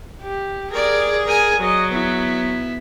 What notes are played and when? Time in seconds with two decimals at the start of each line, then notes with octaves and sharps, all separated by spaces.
0.22 G4
0.71 G#4 A#4 D5
1.25 A#4 G#5
1.61 F#3 D#5
1.91 B3 E4